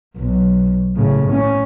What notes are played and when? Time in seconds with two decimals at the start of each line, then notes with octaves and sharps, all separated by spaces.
0.18 B1
0.96 A2 C#3
1.32 C#4